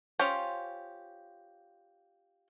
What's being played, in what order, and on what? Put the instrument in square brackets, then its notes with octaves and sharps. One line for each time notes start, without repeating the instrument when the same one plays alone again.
[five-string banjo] C#4 F4 G4 C5